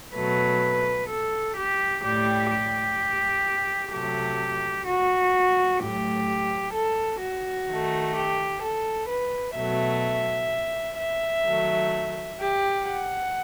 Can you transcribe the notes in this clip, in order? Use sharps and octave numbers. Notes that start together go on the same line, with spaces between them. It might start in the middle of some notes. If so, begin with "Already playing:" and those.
B2 F#3 A3 B4
A4
G4
A2 G3 G4
G4
C3 F#3 A3 G4
F#4
A2 F#3 A3 G4
A4
F#4
D#3 A3
G4
A4
B4
B2 F#3 A3 E5
E5
D#3 F#3 A3
G4
F#5